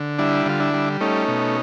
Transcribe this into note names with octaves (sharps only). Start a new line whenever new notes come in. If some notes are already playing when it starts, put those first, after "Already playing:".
Already playing: D3
G3 D4 E4
D3 F4
D4 E4
G3
A3 C#4 D#4
B2